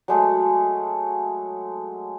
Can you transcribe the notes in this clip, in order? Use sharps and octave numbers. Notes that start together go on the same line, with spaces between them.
F#3 G#3 A3 G#4